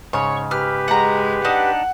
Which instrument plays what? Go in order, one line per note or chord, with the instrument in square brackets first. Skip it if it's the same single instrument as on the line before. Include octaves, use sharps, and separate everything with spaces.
[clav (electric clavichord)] G#2 C#3 [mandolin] C#5 [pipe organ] C#6
[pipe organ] G4 B4 [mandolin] F6
[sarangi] G#3 [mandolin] F#5 A#5
[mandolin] D4 D#4 [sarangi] F#5